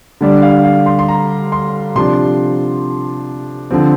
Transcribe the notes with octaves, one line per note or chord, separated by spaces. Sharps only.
D3 G3 D4
F5
F5
C6
C6
A#5
C6
C3 F3 D4 C6
D3 F3 C4